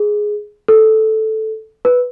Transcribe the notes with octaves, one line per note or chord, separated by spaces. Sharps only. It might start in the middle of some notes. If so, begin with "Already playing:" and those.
Already playing: G#4
A4
B4